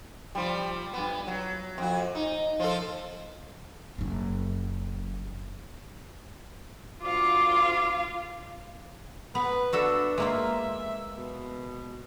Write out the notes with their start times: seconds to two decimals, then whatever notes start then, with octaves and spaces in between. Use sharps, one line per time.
0.35 F3 G3
0.93 G2 B3
1.27 F#3
1.78 F2 F#4
2.15 D#4
2.60 F3 F4 A4
3.98 F#1 F#2
7.03 D2 F4 F5 D6
9.35 B3 B4
9.73 D4 F#4 A4 E5
10.18 G#3 A#3 F4 E5
11.17 B2